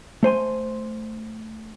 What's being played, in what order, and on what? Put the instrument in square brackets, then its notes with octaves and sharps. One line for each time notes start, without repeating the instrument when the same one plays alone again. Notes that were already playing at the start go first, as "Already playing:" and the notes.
[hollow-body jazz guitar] A3 C5 G#5 C6